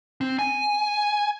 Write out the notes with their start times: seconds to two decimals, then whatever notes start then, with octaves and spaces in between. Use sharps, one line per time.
0.21 C4
0.39 G#5